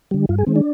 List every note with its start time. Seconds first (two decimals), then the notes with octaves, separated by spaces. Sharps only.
0.11 D3 G3
0.29 G2 F4
0.38 G#4
0.47 D#3 G#3 C4
0.56 D4